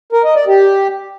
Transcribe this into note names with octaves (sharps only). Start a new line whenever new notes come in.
A#4
D#5
D5
G4